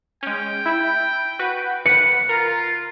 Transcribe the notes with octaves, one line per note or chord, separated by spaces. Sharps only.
G#3 C#4 G5
E4
F#4 B4
B4 F#5 C#7
F4 A#4 A#5